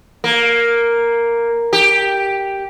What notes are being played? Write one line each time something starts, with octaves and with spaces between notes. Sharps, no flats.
A#3
G4